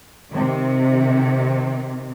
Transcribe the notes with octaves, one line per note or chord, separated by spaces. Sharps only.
C3 D#3